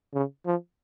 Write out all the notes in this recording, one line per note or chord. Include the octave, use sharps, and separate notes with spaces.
C#3
F3